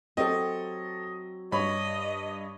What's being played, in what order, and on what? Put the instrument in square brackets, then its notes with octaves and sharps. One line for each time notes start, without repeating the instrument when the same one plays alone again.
[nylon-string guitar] F#3 C4 G4 [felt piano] A4 C#5 [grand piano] D#5
[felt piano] G2 [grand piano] C#5 B5 [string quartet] D#5